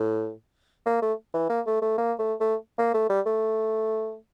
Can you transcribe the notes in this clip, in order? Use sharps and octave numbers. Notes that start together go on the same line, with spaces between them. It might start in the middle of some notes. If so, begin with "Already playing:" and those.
Already playing: A2
A#3
A3
E3
A#3
A3
A3
A#3
A3
A3
A#3
A3
G3
A3